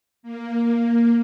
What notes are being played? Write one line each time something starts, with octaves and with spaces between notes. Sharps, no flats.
A#3